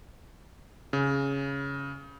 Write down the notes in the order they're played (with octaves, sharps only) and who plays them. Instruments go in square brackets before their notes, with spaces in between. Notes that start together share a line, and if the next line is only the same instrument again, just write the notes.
[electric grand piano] C#3